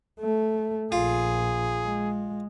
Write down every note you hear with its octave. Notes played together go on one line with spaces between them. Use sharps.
A3
A#1 F4 G#4
G#3